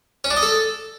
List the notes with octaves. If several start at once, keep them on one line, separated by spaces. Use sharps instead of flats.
C#4
D4
D#5
A4